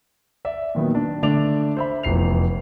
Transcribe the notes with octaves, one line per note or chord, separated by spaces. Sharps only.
D5 E5
A#2 D#3 F#3 B3
D4
D3 A3 D4 D6 F7
C5 E5 B5
F1 E2 C7 F7